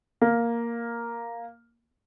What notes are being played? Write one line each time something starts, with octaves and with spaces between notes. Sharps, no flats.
A#3